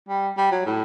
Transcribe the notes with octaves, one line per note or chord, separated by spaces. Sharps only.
G3
G3
F#3
A2